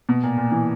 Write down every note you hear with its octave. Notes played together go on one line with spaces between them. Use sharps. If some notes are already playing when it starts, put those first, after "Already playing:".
B2
A#2
A#2
E3